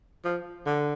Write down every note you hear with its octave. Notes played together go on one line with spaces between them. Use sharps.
F3
D3